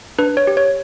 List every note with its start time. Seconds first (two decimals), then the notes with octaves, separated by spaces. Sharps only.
0.18 D4 B4
0.37 C#5
0.47 G4
0.57 C#5